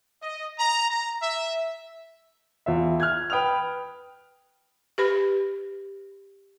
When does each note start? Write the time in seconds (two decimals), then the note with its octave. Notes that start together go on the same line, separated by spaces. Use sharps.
0.22 D#5
0.59 A#5
0.89 A#5
1.22 E5
2.66 E2 F4 E5
3.00 F6 F#6 G#6
3.30 B4 G5 D#6 F6 F7
4.98 G4 B4 B5